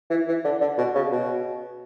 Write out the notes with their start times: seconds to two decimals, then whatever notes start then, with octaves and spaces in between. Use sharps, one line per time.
0.10 E3
0.28 E3
0.44 D3
0.61 D3
0.78 B2
0.95 C#3
1.12 B2